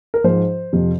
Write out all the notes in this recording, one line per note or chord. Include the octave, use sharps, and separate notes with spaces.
A#4
G#2 F3 C5
F2 C3 F3